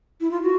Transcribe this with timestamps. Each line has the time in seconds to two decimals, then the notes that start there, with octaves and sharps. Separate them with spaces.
0.21 E4
0.31 F4
0.42 F#4